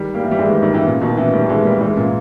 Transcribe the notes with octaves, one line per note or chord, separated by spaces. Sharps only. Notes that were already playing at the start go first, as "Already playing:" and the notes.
Already playing: D#3 G3
G3 A#3
E3
G3
E3 G#3
D#3 G3
D#3 G3
C#3 E3
A#2 C#3
B2 D#3
C#3 E3
D#3 G3
E3 G#3
G3 A#3
E3 G#3
A#2 C#3